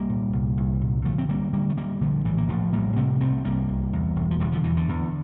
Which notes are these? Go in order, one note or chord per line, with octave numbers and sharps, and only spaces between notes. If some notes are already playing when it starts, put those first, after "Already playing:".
Already playing: C2 G3 A#3
A#2
C2
C2
A#2
D3 F3 A3
C4
D3 G3 A#3
D3 G3 A#3
A3
D2 G3 A#3
A#1 D3 F3
A2 E3 G3
A#3
A#1 F3 A3
A2 G3 A#3
C3 A3 C4
C2 A3 C4
C2 G3 A#3
C2
E2
E1
F3
E1 E3 G3
D3 F3
E2 E3
D3
E2